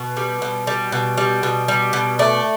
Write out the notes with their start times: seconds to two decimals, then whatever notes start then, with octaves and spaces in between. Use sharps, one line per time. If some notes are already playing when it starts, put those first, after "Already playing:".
Already playing: B2 B4
0.17 G3
0.42 B2
0.67 G3
0.92 B2
1.17 G3
1.43 B2
1.68 G3
1.93 B2
2.19 A3 D5